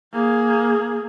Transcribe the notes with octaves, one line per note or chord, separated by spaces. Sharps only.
A#3 G#4